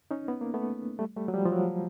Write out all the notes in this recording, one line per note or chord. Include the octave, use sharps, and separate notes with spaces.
C#4 D#4
B3
A#3
A3 B3
G3 A3
G3 A3
F#3
F3 G3
F3
F#3